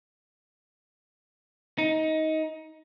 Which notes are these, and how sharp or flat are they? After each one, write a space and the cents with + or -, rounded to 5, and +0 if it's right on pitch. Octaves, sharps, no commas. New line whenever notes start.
D#4 +20